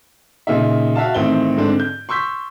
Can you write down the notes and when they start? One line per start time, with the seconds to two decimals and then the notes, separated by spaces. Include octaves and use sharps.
0.47 A#2 C#3 D#4 E5
0.95 F#4 E5 F5 A5
1.14 A1 D#3 C4 E5 G7
1.57 G#2 D3 C4 D4
1.80 G6
2.09 C6 C#6 E6 G6 B6